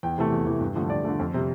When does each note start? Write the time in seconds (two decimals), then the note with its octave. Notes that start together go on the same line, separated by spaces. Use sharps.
0.03 E2 G5
0.18 C3 E3 A3
0.32 E2
0.46 C3 E3 A3
0.60 G2
0.76 D3 F3 A3
0.90 G2 D5
1.04 D3 F3 A3
1.20 F2
1.34 C3 G3